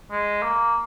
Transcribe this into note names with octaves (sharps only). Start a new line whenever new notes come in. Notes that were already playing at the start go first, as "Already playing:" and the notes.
G#3
A#3